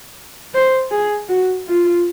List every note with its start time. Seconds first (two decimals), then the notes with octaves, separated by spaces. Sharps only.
0.54 C5
0.91 G#4
1.29 F#4
1.67 F4